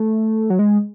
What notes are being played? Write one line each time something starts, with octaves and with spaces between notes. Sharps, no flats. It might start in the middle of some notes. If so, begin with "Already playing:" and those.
Already playing: A3
F#3
G#3